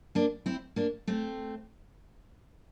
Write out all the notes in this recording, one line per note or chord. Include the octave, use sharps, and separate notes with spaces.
A#3 D4
C4 E4
A#3 D4
A3 C4